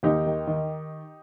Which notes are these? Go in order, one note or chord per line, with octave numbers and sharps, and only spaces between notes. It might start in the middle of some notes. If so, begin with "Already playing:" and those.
D#2 D#4 G4
D#3
D#3